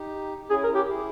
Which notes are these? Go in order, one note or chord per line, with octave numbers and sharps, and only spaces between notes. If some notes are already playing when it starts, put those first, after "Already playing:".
Already playing: D#4 G4
G4
C#4 E4 G#4
A#4
C#4 E4
G4
E4 G#4